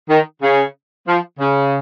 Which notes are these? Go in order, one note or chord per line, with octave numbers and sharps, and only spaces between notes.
D#3
C#3
F3
C#3